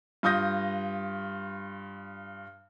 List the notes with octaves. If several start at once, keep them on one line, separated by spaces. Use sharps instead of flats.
G2 F4 D#6 G6 A#6